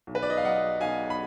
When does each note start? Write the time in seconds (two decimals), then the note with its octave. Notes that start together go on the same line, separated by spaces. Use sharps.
0.07 B1
0.15 B4
0.22 D5
0.30 D#5
0.37 F5
0.44 F#3 D#5 F#5
0.81 B1 F5 G#5
1.10 B5